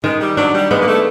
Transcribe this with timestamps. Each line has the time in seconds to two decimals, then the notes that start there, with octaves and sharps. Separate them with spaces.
0.04 D#3 G#3
0.20 G3
0.37 F#3 D4
0.54 G3
0.70 G#3 B3
0.81 A#3
0.88 A3